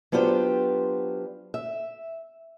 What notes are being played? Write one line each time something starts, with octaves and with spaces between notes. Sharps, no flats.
F#3 B3 D4 F4 G4 C5
E5